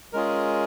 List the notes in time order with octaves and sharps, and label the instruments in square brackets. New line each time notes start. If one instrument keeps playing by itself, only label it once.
[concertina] G#3 C#4 F4 G#4 A#4